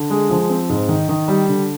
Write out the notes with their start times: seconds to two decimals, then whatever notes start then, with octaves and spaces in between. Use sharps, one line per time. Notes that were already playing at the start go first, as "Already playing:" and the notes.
Already playing: D3
0.10 G#3
0.30 F3
0.50 C4
0.69 G#2
0.88 D#3
1.09 D#3
1.28 G3
1.48 D3